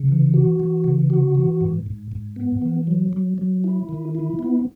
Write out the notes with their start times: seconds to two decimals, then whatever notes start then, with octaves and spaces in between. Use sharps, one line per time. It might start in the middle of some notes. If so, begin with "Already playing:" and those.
Already playing: C#3
0.08 E3
0.34 F#4
0.60 E3
0.84 C#3
1.10 F#4
1.35 E3
1.61 G#2
1.86 G#2
2.12 G#2
2.36 B3
2.62 E3
2.87 F#3
3.13 F#3
3.38 F#3
3.64 E4
3.89 D#3
4.15 E4
4.39 B3